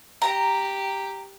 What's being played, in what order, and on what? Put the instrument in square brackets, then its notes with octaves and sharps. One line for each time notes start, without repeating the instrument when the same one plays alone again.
[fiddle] G4 [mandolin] A#5